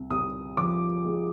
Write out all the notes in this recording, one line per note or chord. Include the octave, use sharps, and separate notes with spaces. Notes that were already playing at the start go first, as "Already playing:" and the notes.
Already playing: C2
C2 D#6
F3 D6
G#3